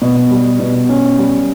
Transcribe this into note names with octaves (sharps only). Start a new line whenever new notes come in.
B2
G3
B2
C#4
G3